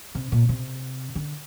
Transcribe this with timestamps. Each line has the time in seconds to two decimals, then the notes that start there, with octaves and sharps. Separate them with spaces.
0.15 C3
0.32 A#2
0.49 C3
1.15 D3